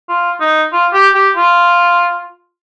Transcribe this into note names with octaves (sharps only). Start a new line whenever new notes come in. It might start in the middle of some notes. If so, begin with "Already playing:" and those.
F4
D#4
F4
G4
G4
F4